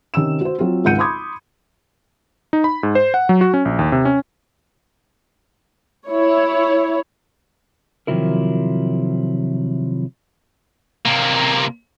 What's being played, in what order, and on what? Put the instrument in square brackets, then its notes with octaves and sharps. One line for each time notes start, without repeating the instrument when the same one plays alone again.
[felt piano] C3 D#3 C#4 E6 E7
F#4 C5
F#3 C4 F4
G#1 C#2 F#5 G6 C#7 D#7
B5 C6 D6 D#6 G#6
[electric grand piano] D#4
B5
G#2
C5
F#5
F#3
F#4
C#4
A#1
D#2
C3
C#4
[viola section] E4 C#5
[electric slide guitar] C3 D#3 F3 F#3 E4 A#4
[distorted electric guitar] C3 A#3